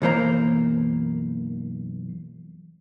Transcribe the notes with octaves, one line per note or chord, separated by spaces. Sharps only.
B1 F#2 E3 A#3 C5 A#5